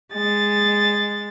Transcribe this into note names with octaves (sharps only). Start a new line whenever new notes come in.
G#3 A6